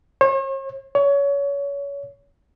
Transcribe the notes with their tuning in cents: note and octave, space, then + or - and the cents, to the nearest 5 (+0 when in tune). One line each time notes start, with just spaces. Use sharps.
C#5 -45
C#5 +25